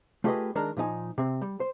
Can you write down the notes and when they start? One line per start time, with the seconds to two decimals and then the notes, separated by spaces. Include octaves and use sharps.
0.24 A3 F4 G4 G#4 B4 D#5
0.55 D#3 G#3 D4 A#4
0.77 A#2 F3 D#4 G#5
1.18 C3 C4
1.41 G3
1.60 C5